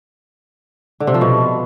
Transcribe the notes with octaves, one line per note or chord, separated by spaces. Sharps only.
D3
C3
F3
B2